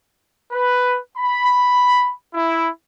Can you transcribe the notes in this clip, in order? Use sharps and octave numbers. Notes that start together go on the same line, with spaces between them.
B4
B5
E4